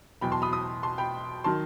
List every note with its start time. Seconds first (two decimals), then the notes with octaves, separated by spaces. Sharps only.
0.21 E2 B2 F#3 G5 B5
0.32 A5 C6
0.42 B5 D#6
0.52 B5 D#6
0.83 A5 C6
0.98 G5 B5
1.44 D#3 F#3 A5 C6